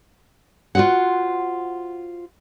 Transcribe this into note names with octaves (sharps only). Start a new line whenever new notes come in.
F4 F#4 G#4 C5 F#5